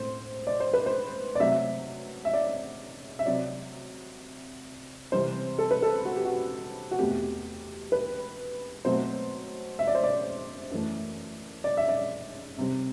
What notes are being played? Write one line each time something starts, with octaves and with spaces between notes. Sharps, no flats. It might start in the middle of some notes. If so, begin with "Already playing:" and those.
Already playing: A2 C4 C5
D5
C5
B4
C5
D5
C3 F#3 A3 C4 E5
E5
D5
E5
C3 F#3 C4 D5
C3 E3 G3 C4 C5
A4
B4
A4
F#4
G4
F#4
F#4
E2 B2 A3 C4 G4
B4
B2 F#3 A3 C4 C5
E5
D5
C5
D5
F#2 E3 A3
D5
E5
D5
C3 G3 C4